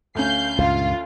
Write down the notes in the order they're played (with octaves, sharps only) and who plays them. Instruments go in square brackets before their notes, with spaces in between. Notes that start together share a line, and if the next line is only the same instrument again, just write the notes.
[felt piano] D2 C#4 [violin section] F5 G6 C7
[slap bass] C#2 G2 A#2 [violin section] F4 [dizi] F5